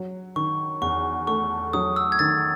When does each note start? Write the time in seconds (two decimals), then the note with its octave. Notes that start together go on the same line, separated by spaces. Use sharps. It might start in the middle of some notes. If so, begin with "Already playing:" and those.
Already playing: F#3
0.36 D#3 C#6
0.81 E2 C#6
1.27 A3 C#6
1.73 F#3 D#6
1.96 E6
2.12 G#6
2.19 D#3 A6